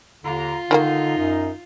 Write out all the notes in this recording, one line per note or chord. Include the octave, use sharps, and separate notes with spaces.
D#2 D3 F4 A#5
D3 D#3 G3 A#3 D#4
F#2